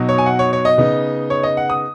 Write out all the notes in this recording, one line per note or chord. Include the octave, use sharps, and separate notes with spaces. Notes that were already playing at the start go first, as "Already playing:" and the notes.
Already playing: B2 F#3 D#4
C#5
G#5
F#5
C#5
C#5
D#5
C#3 B3 D#4
C#5
D#5
F#5
D#6